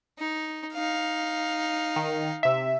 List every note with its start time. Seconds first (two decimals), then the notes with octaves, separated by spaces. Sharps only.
0.19 D#4
0.73 D#4 F5
1.96 D#3
2.43 C3 E5